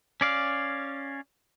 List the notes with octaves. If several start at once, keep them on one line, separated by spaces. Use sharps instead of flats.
C#4 D5 F5